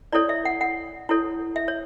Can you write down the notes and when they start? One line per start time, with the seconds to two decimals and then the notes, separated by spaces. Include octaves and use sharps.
0.12 E4 A4 C#5 D5
0.29 E5
0.45 F#5
0.61 F#5
1.09 E4 A4 C#5
1.56 E5
1.68 C#5